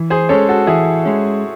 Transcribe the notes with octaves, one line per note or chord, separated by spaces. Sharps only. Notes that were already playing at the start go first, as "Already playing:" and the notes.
Already playing: E3
G#4 C5
G#3 C#4 A4 C#5
F#4 A4
E3 E4 G#4
G#3 C#4